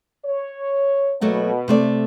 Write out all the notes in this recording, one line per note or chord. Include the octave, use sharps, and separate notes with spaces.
C#5
B2 F#3 A3 A#3
C3 A3 D5